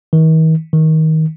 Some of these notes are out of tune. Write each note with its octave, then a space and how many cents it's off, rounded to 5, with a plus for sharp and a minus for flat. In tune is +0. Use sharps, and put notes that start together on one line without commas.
D#3 +45
D#3 +25